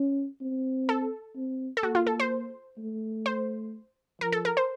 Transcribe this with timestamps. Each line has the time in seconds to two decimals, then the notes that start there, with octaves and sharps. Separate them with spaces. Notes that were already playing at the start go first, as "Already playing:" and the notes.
Already playing: C#4
0.41 C4
0.89 A4
1.36 C4
1.77 A4
1.83 A#3 F#4
1.95 F4
2.07 A4
2.20 C5
2.78 A3
3.26 C5
4.21 F3 A#4
4.32 A4
4.45 A#4
4.57 C5